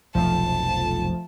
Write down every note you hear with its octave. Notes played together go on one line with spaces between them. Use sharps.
F1 B1 B2 F3 A3 A5